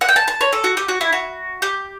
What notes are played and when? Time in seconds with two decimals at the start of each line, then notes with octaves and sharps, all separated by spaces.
0.01 F#5
0.09 G5
0.16 A5
0.28 A5
0.41 C#5
0.53 A4
0.64 F#4
0.77 G4
0.89 F#4
1.01 E4
1.13 F#4
1.62 G4